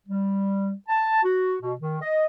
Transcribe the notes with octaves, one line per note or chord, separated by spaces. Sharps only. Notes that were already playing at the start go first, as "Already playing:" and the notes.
G3
A5
F#4
B2
D#3
D#5